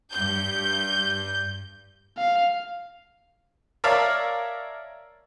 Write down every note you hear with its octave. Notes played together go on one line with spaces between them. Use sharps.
G2 G6
F5
A#4 C#5 D5 E5 F5 A5